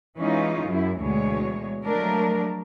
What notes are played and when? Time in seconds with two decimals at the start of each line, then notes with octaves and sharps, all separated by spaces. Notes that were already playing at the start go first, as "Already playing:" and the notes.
0.17 E3 G#3 C#4 D#4 F4
0.67 F#2 E4
1.00 D2 B2 E3 G#3 C#5
1.84 F3 F#3 G#3 A3 D4 A#4